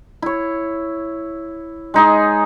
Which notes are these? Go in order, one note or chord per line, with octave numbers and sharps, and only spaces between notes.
E4 C#5
G#3 D#4 G#4